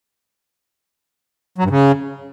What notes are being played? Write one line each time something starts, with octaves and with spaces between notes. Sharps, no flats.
F#3
G2
C#3